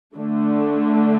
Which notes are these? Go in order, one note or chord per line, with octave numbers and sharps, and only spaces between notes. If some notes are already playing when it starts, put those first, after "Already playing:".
D3 A3 D4